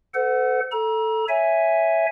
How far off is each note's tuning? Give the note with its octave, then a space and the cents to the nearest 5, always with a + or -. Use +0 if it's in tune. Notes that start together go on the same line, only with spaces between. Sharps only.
A4 +0 C5 -45 F#5 +0
A4 +0 A#5 +35
C#5 +0 E5 +0 G#5 +0